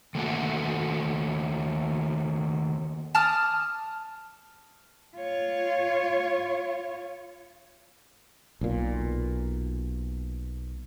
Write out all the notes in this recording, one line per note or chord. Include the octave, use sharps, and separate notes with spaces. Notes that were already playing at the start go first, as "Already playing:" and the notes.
D#3 A3 A#3 F#4 A4
A5 D6 D#6 F6
F4 C#5
B1 A#2